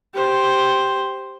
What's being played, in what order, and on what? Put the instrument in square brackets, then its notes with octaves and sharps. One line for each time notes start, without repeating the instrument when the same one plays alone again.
[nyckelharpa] G4 C5